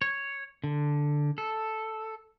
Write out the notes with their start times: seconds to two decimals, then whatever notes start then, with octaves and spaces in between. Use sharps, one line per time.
0.02 C#5
0.64 D3
1.38 A4